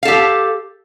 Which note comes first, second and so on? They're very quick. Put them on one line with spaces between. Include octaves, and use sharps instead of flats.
F5 A4 G4